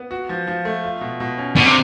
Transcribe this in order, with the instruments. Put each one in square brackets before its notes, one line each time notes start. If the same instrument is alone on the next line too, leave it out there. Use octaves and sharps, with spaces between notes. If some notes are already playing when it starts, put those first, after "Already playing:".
Already playing: [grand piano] B3
F#4
F3
F3
A3
F4
B2
B2
C#4
[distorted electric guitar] B2 [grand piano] D4
[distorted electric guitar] C3